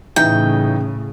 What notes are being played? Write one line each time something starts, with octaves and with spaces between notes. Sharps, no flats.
A2 C#3 E3 D#4 G5